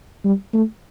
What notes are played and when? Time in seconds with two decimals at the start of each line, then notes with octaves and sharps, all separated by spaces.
0.24 G3
0.54 A3